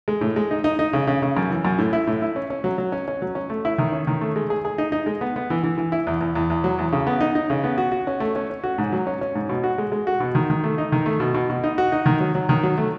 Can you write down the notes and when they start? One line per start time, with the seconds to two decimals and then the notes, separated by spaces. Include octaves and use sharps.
0.08 G#3
0.21 A2
0.36 G#3
0.51 D#4
0.64 D#4
0.79 D#4
0.93 C#3
1.07 C#3
1.22 C#3
1.37 F#2
1.51 E3
1.65 F#2
1.78 A2
1.93 E4
2.07 A2
2.22 E4
2.36 C#4
2.50 C#4
2.64 F#3
2.78 F#3
2.92 C#4
3.08 C#4
3.22 F#3
3.35 C#4
3.50 A3
3.65 E4
3.78 D#3
3.92 C#4
4.07 D#3
4.21 A3
4.36 G#3
4.50 G#4
4.65 G#4
4.78 D#4
4.92 D#4
5.06 G#3
5.21 B3
5.36 B3
5.50 E3
5.64 E3
5.78 E3
5.92 E4
6.07 E2
6.21 E2
6.35 E2
6.50 E2
6.64 F#3
6.79 E2
6.92 C#3
7.07 B3
7.21 D#4
7.35 D#4
7.50 C#3
7.64 B3
7.78 F#4
7.92 F#4
8.07 C#4
8.20 A3
8.36 C#4
8.50 C#4
8.64 F#4
8.78 G#2
8.92 F#3
9.07 C#4
9.21 C#4
9.35 G#2
9.49 B2
9.64 F#4
9.78 G#3
9.92 G#3
10.07 F#4
10.20 B2
10.35 D#3
10.50 D#3
10.64 A3
10.78 D#4
10.92 D#3
11.06 A3
11.20 B2
11.34 B2
11.50 B2
11.64 D#4
11.78 F#4
11.92 D#4
12.06 D#3
12.20 F#3
12.35 F#3
12.49 D#3
12.63 F#3
12.78 A3